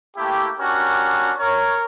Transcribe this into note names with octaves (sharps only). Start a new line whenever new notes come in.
A3 A#3 E4 G4
C#4 D4 F#4 G4 A#4
A#4 C#5